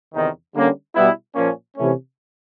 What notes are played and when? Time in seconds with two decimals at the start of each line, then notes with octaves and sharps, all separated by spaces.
0.14 E2 C3 D#3
0.54 D3 G3 A#3 C#4
0.95 B2 G3 B3 E4
1.35 A#2 F3 A#3 C#4
1.77 C3 E3 A3 C#4